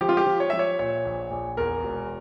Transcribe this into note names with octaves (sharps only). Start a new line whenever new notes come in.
F3 G4
F4
G4
F3
C#5
F3 E5
C#5
A#2 C#5
A#1
A#1
E2 A#4
E1